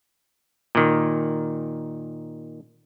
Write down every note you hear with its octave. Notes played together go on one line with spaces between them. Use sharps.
A#2 D#3